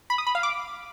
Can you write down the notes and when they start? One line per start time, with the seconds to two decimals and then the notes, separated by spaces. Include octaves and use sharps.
0.10 B5
0.18 D#6
0.27 B5
0.35 F5
0.43 D6